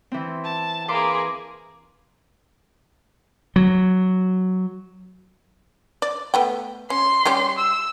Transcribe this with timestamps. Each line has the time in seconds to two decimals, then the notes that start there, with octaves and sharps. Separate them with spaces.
0.12 E3 C4
0.44 A5
0.88 A#3 G#4 B4 C6 D6
3.56 F#3
6.02 D5
6.34 A3 B3 G5
6.90 C#4 C6
7.25 G3 C#4 G4
7.59 E6